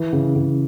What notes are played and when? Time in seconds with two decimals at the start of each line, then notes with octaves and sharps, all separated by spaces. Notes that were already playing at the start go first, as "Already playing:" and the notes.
Already playing: E3
0.13 C#3
0.36 C#3